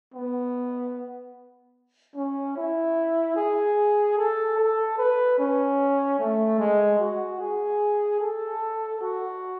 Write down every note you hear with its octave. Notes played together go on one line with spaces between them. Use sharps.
B3
C#4
E4
G#4
A4
A4
B4
C#4
A3
G#3
F#4
G#4
A4
F#4